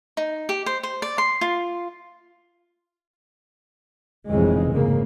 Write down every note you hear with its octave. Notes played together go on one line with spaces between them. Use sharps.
D#4
G4
C5
C5
D5
C6
F4
F1 A#1 F2 C#3 E3 G#3
G#2 C#3 A#3